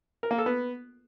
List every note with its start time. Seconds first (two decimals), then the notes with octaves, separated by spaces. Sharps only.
0.23 A#4
0.31 A#3
0.38 A4
0.46 B3